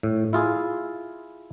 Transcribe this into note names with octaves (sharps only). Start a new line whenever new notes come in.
A2
E4 F4 G#4